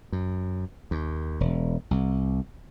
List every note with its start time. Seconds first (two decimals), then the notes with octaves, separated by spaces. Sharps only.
0.12 F#2
0.91 D#2
1.40 E1
1.91 C2